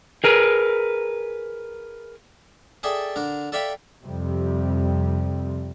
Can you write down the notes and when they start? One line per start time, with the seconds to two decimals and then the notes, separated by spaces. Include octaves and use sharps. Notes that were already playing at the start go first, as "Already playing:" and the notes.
0.24 G#4 A#4 B4
2.83 G#4 A4 D5 E5 G5 A5
3.16 D3 D4 A#4
3.52 A4 D5 E5 F5 G5 B5
4.04 F2 C3 G3